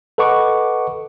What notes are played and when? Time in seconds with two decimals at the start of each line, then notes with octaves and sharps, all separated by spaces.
0.18 A4 B4 D#5 F#5 C#6 D6